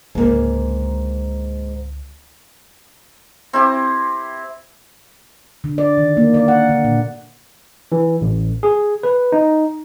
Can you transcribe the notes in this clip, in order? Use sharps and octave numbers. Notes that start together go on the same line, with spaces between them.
C#2 G#2 D3 A#3
C4 E4 G4
D3
D5
D#3
A#3
D5
F#5
D3
A#2
E3
A1
G#4
B4
D#4